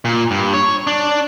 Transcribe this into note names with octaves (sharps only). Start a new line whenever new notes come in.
A#2
G2
C#5
D4